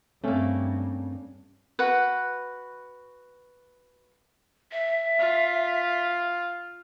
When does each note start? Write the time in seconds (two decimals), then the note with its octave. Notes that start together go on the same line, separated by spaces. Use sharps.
0.24 G2 A3 A#3 C4 C#4
1.79 F#4 B4
4.72 E5
5.19 F4